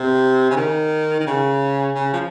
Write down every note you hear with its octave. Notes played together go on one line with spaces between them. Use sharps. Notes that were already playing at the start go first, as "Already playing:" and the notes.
Already playing: C3
C#3
D#3
D#3
C#3
C#3
F3